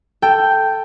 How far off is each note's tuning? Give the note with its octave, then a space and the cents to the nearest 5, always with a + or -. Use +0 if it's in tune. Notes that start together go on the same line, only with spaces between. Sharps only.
A4 +5 G5 +0